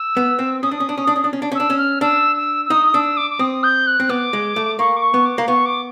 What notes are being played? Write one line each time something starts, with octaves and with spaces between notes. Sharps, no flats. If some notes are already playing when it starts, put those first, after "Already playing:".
Already playing: E6
B3
C4
C#4 D#6
D4
C#4
D4
C#4
D4
C#4
D4
C#4
D4
C#4
D4 E6
C#4
F6
D4 E6
E6
E6
D#4 D#6
D#6
D4 E6
D6
D6
C4 D#6
G6
F#6
C4
B3 D6
G#3
A3
A#3 C#6
D6
C#6
B3
D6
A#3
B3 C#6
D6